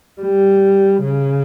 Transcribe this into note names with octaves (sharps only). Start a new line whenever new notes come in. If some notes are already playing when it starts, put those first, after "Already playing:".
G3
C#3